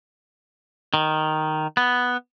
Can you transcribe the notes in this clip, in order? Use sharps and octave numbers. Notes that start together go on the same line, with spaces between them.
D#3
B3